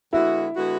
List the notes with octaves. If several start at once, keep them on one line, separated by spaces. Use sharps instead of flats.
D3 G#3 B3 E4 F#4
D3 G#3 B3 F#4